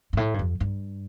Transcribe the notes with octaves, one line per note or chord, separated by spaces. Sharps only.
G2
A2
G2
F2
G2